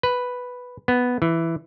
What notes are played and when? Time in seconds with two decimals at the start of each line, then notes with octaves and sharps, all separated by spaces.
0.03 B4
0.88 B3
1.22 E3